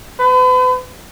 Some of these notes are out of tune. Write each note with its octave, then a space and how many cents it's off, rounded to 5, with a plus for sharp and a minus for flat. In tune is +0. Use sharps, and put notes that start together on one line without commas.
B4 +40